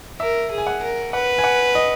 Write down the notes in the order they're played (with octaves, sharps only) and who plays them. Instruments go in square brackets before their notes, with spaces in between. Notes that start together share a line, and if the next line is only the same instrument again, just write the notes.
[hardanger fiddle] A#4 [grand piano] E5
[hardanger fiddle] G#4
[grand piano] G#5
F#5
[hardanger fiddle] A#4
[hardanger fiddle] B4 [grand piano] F#5
[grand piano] G#5
F#5
D#5